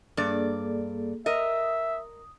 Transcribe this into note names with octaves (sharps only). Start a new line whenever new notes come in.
G2 A#3 G#4 A4 D5
A#4 D#5 E5 D#6